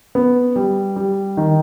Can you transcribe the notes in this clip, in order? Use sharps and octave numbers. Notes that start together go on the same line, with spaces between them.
B3
G3
G3
D#3